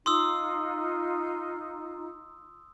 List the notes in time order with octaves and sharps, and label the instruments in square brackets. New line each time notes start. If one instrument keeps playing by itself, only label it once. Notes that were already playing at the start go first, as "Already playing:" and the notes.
[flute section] D#4 F4 [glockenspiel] C6 D#6 E6